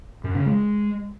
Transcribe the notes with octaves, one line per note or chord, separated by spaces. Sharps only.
F#2
C#3
G#3